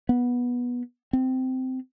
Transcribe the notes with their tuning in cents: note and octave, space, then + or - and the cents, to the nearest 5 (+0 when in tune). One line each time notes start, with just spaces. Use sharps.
B3 -15
C4 -15